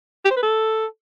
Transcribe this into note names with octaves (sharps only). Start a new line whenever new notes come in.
G4
C5
B4
A4